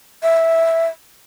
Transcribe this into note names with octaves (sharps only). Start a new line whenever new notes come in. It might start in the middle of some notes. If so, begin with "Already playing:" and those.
E5